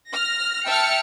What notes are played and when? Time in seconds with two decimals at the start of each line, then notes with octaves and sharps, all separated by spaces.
0.11 F6 A#6
0.65 E5 G5 A5 F6 C#7